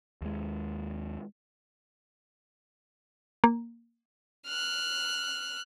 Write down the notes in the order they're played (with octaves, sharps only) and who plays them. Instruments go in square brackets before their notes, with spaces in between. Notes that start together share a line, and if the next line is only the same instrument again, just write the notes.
[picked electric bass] D#2 G#3
[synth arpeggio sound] A#3
[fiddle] F6 F#6